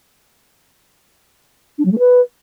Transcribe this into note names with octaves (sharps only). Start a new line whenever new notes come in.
D4
F#3
A3
B4